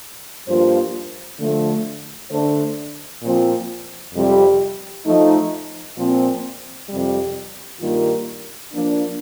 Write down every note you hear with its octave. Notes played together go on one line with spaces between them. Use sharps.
G2 F3 A#3 F4 C5
D3 F3 A3
D3 A3 D4 A4 C5
A#2 F3 C4
F2 C3 G3
F3 A3 D#4
A#2 F3 C4
F2 C3 G3
G2 D#3 G3 A#3 F4
F3 A#3 D4